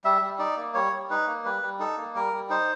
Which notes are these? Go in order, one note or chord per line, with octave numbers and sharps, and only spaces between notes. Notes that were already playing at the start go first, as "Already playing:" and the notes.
G3 E5
G3
D#4 D5
A#3
G3 C#5
G3
D#4 B4
A#3
G3 B4
G3
D#4 A4
A#3
G3 A#4
G3
D#4 C5